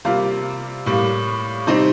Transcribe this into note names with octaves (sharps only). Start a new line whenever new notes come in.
C3 G3 A#3 F4
A2 G3 A#3
C3 G3 C4 D#4